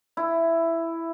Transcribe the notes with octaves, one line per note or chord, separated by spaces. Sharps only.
E4